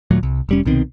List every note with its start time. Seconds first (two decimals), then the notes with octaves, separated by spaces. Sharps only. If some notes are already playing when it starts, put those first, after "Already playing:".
0.11 D#2 A#2 F#3 A3
0.23 C2
0.49 F1 G3 C#4
0.65 C2 B2 D#3 C4